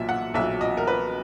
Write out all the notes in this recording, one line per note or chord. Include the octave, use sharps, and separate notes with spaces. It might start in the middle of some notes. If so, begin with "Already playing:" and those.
Already playing: B1 A#2 F#3 E5
F#5
B1 A#2 F#3 E5
D#5
A#4
B4